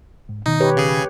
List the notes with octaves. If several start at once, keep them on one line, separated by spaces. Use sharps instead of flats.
G#2
B2 D#3 D#4
G4 B4 C#5
C#3 G#4